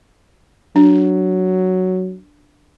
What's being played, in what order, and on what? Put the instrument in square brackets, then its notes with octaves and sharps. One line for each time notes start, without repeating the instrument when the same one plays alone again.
[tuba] F#3 [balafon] D4